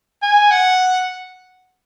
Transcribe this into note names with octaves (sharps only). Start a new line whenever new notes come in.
G#5
F#5